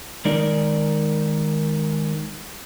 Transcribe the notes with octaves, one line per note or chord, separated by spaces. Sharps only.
D#3 G#3 D#4 A#4 D5